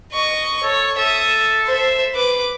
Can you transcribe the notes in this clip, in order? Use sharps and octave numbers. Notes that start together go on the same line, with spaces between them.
D#5 C#6
A4 C#5
A4 E5 D#6
C5 E5
B4 D6